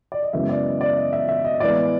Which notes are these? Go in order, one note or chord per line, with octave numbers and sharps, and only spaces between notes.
D5
D#5
F#2 C#3 E3 G#3 B3 E5
D5
D#5
D5
D#5
E5
E5
D#5
A2 E3 G#3 B3 D5